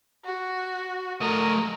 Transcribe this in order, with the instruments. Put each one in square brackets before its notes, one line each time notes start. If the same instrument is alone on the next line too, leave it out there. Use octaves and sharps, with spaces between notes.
[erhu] F#4
[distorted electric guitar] A3 D#5 [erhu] A#4